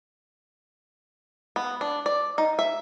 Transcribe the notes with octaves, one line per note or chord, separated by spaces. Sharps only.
B3
D4
D5
D#4
E5